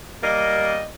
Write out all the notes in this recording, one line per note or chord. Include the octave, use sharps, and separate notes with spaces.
G3 A#3 D#5